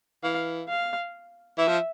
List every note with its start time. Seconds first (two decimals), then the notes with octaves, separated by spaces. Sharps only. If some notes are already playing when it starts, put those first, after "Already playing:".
0.23 E3 F5
0.69 F5
1.58 E3 E5
1.68 F3